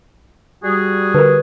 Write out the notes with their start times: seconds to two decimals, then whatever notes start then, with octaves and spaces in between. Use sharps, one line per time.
0.63 G3 F#4 G#4
1.14 D3 A#4 B4